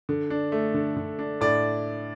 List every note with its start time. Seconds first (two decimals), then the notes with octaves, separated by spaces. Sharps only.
0.09 D3
0.30 D4
0.52 A3
0.74 D3
0.97 D3
1.19 D4
1.41 A2 D5